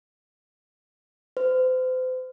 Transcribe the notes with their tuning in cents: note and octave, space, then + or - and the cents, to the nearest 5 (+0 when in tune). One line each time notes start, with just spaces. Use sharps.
C5 -35